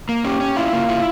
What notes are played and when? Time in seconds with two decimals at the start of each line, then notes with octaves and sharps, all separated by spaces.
0.09 A#3
0.25 C#4 G4
0.41 C#4
0.56 E4 F4
0.73 A#3
0.89 E4